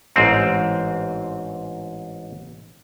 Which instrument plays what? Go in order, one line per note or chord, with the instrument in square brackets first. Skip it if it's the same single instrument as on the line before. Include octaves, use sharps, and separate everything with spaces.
[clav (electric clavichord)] A1 G#2 C4